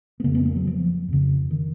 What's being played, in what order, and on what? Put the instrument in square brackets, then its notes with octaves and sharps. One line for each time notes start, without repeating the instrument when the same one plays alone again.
[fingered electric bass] B3
F2 C#3 A#3
B3
A#3
F#3
F3
F2 C#3
D#3